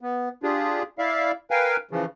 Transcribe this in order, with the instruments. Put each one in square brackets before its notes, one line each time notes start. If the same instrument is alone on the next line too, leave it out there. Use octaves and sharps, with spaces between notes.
[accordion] B3
D4 F4 G4 G#4
E4 D5 E5 F5
A#4 B4 F5 G5 G#5
C#3 E3 F3